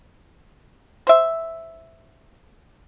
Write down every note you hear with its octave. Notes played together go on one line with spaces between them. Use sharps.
C5 E5